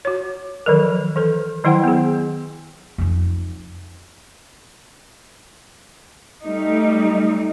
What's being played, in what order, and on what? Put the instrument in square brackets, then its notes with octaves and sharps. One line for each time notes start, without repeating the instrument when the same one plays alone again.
[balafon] F#4 C#5
D#3 F3 F#3 A4 A#4
E3 A4 B4
D#3 F#3 E4 C5 F#5 G5
B3 G#4
[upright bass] F2 D#4
[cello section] G3 A3 D#4